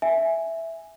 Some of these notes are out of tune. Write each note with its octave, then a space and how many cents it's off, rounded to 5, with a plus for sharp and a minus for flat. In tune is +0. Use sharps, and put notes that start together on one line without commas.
E5 +0 G#5 +0